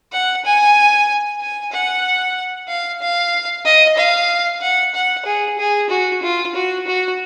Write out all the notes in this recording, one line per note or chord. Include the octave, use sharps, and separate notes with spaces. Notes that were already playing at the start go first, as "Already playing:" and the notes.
F#5
G#5
G#5
F#5
F5
F5
D#5
F5
F#5
F#5
G#4
G#4
F#4
F4
F#4
F#4